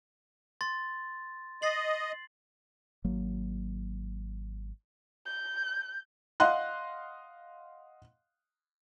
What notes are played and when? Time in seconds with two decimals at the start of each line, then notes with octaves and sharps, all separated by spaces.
0.61 C6 A6
1.62 D#5 A6 C7 F#7
3.04 G#1 F#3 A#3
5.26 G6
6.40 D#5 F5 F#5 C6 F#6